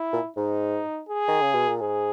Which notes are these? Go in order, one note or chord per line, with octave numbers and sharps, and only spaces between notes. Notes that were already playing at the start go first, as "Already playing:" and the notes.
Already playing: E4
A#2
G#2 D#4
G#4
D#3
C#3
B2
A#2
G#2 G#4